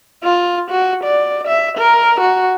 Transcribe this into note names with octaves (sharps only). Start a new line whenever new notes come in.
F4
F#4
D5
E5
A#4
F#4